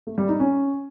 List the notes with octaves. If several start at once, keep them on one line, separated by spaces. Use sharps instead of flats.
A3
G3
D#4
C#4